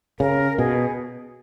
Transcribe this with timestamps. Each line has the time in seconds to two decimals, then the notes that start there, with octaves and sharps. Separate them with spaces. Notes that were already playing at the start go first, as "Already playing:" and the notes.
0.19 C#3 A#4
0.58 B2 G#4